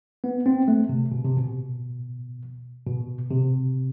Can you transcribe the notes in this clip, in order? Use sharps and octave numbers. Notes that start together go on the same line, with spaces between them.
B3
C4
A3
C3
B2
C3
B2
B2
C3